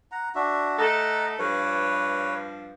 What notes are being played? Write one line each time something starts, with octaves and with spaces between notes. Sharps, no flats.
F#5 A#5
D4 F#4 E5
A3 D#4 A4 D#5 F#5 A#5
G2 F3 B4 C#5